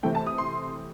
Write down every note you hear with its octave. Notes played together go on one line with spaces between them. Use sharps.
C3 E3 A3 C4 G5
A5
D#6
C6